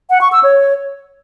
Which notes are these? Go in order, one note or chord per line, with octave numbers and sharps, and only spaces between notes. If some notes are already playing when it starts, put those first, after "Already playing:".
F#5
C#6
E6
C#5